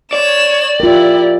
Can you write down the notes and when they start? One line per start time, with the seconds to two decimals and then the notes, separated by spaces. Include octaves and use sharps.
0.13 C#5 D5 E7
0.80 E4 F4 G4 A#4